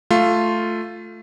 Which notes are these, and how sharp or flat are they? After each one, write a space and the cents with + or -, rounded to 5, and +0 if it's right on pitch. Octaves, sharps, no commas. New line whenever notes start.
A3 +0 F4 +0